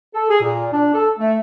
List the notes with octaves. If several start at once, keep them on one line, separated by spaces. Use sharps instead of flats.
A4
G#4
A#2
D4
A4
A3